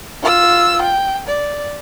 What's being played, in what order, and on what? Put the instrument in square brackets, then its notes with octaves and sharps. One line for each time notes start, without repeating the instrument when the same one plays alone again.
[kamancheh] F4 E6
G5
D5